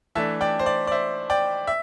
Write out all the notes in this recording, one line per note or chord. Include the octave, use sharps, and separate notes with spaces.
E3 A3 D4 E5 A5
D5 G5
C5
D5
D5
C5 E5
D5 G5
E5